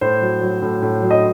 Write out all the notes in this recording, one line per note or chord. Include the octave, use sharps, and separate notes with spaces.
A2 C5
F#3
F#3
A2
A2
F#3
D#5